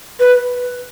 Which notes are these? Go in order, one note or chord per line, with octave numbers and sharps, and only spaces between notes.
B4